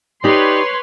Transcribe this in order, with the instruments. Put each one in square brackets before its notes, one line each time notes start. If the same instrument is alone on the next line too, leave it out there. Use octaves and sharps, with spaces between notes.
[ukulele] D#4 [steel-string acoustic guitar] G4 D5 [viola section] B4 C#5 C6